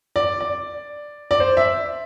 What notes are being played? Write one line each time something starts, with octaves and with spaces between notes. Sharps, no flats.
D5
D5
D5
C5
E5